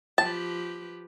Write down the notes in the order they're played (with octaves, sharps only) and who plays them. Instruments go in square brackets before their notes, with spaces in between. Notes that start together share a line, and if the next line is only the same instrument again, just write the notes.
[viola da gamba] F3 G4 B4 [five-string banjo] A5